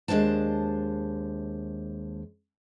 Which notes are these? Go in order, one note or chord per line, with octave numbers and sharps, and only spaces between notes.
D#2 G#3 D4 C5 A5